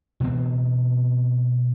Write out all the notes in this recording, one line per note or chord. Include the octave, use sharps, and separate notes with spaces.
B2 E3 B3 C4